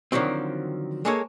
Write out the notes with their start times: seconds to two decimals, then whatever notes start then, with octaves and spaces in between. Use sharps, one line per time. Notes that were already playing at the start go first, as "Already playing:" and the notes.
0.12 D3 D#3 F3 F#3 C4
1.05 G#3 A#3 G#4 A4 C#5